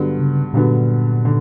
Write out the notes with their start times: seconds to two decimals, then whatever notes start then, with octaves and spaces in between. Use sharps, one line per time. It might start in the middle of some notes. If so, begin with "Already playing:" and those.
Already playing: G2 D3 F#3 B3
0.19 C#3
0.53 G2 A#2 D3 F#3 B3
1.25 D3